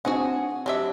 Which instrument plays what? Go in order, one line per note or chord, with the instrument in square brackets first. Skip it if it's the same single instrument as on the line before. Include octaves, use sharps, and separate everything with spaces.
[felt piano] C4 D4 G#5 [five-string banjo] F#4 G#4 F#5
[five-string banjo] F#3 D4 E5 [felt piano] G4